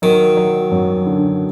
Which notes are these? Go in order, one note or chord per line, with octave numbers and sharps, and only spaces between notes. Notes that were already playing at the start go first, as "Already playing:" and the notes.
D#3 F#3
F#3
F#2
D3